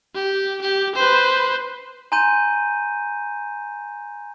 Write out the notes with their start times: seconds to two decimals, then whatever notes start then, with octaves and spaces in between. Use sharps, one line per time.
0.15 G4
0.62 G4
0.95 B4 C5
2.12 G#5 A#5 C6 G6 D#7